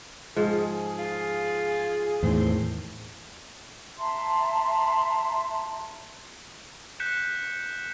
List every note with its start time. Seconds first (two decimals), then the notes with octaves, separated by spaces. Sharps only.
0.36 G#2 F3 G#4
0.98 F4
2.23 E2 A2 D#3 C4
3.98 E5 A5 A#5 C6
7.00 F#6 G6 B6 C#7 E7